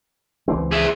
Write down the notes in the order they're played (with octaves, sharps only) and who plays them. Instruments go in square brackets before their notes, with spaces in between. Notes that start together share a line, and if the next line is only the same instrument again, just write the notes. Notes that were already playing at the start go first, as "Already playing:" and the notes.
[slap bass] C#2 E3 C4
[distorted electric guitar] G#4 E5